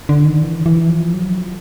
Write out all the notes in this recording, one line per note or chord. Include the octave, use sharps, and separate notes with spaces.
D3
D#3
E3
E3
F3
F#3
F3